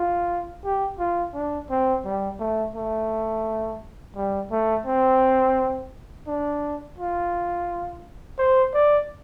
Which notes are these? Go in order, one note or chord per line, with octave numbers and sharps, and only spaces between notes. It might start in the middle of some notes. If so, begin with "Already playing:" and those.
Already playing: F4
G4
F4
D4
C4
G3
A3
A3
G3
A3
C4
D4
F4
C5
D5